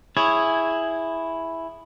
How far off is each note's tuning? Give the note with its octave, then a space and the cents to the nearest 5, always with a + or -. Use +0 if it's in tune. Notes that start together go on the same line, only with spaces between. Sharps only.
E4 +0 G#4 -5 C#5 +0